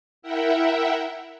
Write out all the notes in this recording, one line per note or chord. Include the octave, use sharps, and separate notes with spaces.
E4 A#4 E5 F#5 G5